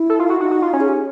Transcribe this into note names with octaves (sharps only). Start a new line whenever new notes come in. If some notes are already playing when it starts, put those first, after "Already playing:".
Already playing: E4
A4
F4
F#4
D#4 F#4
F#4
F4
C#4
G#4
G4